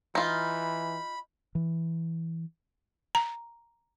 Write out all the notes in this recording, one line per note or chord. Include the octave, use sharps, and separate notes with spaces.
E3 D#4 F4 B5
E3
A#5